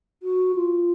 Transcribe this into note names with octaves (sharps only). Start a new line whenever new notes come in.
F#4
F4